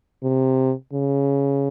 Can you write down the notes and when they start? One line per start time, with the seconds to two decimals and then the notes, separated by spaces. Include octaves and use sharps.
0.23 C3
0.93 C#3